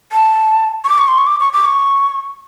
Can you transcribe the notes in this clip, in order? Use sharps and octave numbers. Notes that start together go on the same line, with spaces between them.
A5
C#6
D6
C#6
C6
C#6
D6
C#6
D6
C#6